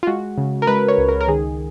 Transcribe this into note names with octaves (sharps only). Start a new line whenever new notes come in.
F4
G#3 F#4
C#3
A#4
G#3 B4
C#5
C#2
A#4
A#4
D#3 G#4